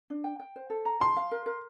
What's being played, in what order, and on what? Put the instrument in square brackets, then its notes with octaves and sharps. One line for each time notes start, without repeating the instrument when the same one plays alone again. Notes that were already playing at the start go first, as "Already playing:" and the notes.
[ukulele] D4
G5
G5
C5
A4
A#5
[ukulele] A5 [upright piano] C6
[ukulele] F5
A#4
A#4